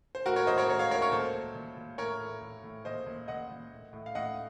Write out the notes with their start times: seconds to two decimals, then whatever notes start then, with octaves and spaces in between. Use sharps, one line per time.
0.15 C5
0.26 A2 F#4 A#4
0.36 A#4 C#5
0.47 A2 C5 D#5
0.58 A#4 C#5
0.68 A2 A#4 C#5
0.79 C#5 F5
0.90 A2 A#4 C#5
1.02 A#4 C#5
1.12 A#2 A4 C5
1.34 A#2
1.55 A#2
1.77 A#2
1.98 A2 A#4 C#5
2.21 A2
2.41 A2
2.64 A2
2.85 A#2 C5 D#5
3.06 A#2
3.28 A#2 D#5 F#5
3.51 A#2
3.72 A2
3.93 A2
4.06 F5
4.15 A2 D#5 F#5